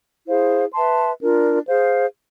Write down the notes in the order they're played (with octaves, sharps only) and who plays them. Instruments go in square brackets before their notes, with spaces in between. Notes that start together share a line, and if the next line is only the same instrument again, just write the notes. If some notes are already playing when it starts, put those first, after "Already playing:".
[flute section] E4 G#4 C5 F5
B4 E5 A5 C6
D4 F4 A#4
G#4 C5 F5